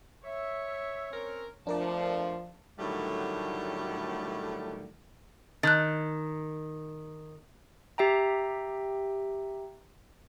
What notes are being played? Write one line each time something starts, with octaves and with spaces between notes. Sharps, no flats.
C#5 E5
C4 C#4 A#4
F2 F3 A3 D4 A#4 D5 A5
A2 D3 D#3 F#3 G3 A3
D#3 F#6 G6 A6
G4 E5 G5 A#5